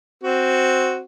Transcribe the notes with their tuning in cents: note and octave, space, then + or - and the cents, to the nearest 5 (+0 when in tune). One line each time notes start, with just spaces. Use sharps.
C4 +0 F#4 +0